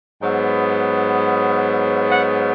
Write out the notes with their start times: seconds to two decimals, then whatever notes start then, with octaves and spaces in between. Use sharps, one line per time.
0.22 G#2 F#3 B3
2.12 F#5